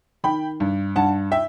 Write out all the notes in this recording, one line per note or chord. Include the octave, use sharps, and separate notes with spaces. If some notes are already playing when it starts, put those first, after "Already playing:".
D#3 G5 B5
G2
G2 F#5 A5
E5 G5